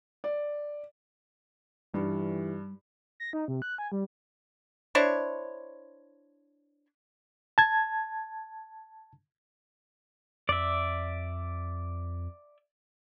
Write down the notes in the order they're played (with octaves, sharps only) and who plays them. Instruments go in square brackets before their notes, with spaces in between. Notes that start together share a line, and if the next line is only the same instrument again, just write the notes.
[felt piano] D5
[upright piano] G2 [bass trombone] E3 [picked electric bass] G3 [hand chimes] D#4 G4 B4
[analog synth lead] A#6
D#4
C3
F#6
G#5
G3
[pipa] D4 E4 C5 C#5
[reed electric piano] A5 G#6
[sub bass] F2 [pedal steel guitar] D5 E5